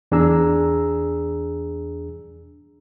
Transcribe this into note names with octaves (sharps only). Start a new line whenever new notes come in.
E2 D4 G#4 A#5 E6